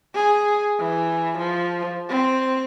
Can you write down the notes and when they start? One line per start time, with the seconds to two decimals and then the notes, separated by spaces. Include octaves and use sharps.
0.14 G#4
0.79 E3
1.38 F3
2.09 C4